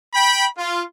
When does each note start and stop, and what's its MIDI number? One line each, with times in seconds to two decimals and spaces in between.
0.14 0.46 79
0.14 0.46 83
0.58 0.82 65